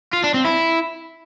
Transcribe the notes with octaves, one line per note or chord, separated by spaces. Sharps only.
F4
D4
C4
E4